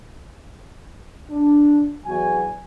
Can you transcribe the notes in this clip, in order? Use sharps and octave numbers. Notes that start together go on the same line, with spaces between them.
D4
E2 F#3 F#4 G#5